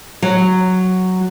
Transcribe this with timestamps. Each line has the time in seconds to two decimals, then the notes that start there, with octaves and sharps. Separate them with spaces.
0.22 F#3